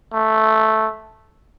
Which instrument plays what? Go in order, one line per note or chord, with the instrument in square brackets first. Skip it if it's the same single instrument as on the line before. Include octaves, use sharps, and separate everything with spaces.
[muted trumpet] A3